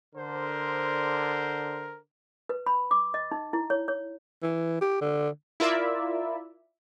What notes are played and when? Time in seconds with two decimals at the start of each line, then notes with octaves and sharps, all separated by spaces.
0.15 D3 A#4 C5
2.49 B4
2.67 B5
2.91 D6
3.14 D#5
3.31 D#4
3.53 E4
3.70 C#5
3.88 C#5
4.43 E3
4.81 G4
5.01 D3
5.60 E4 F4 A#4 D5 E5